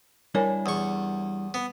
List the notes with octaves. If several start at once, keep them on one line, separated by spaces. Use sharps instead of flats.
G3 D4 E4 A#4 C#5 G#5
E2 C#6
B3